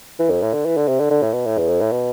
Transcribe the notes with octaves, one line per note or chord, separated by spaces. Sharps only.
E3
F2
A2
D3
E3
D3
C3
D3
D3
A2
B2
A2
E2
F2
A2
B2